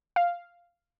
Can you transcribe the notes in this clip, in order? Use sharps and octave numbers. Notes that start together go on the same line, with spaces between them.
F5